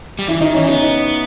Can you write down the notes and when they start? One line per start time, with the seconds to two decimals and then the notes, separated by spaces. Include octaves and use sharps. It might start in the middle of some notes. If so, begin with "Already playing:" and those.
0.19 G3
0.28 E3 E4
0.41 D#3 D#4
0.54 E3 C#4
0.67 B3 D#4